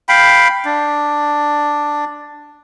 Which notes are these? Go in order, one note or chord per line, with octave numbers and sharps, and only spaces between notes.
F5 G5 B5
D4